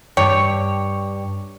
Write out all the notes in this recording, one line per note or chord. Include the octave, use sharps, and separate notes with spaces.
G2 C#5 G5 D6